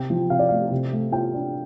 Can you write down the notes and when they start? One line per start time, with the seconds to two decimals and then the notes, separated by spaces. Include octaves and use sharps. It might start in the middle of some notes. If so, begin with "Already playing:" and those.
Already playing: C3 G5
0.10 F3
0.30 C3 F5
0.39 D5
0.49 A3 F5
0.71 C3
0.92 A3
1.12 F4 G5
1.34 D4